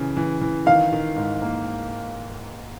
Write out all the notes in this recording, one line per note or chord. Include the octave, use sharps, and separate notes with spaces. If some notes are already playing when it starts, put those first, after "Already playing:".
Already playing: C#3 E3
E3
E3
D#3 F5
D#3
G#2
A#3